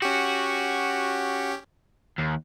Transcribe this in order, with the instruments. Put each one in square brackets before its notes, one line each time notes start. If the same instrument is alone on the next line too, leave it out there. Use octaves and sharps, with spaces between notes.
[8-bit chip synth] C#4 G4 [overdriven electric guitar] F#4
[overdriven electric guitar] D#2